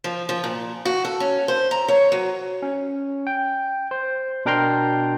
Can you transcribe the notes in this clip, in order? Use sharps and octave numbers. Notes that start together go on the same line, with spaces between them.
F3
F3
A#2
F#4
A4
C#4
C5
A#5
C#5
F#3
C#4
G5
C5
B2 D4 A#4 G5 A#5 C6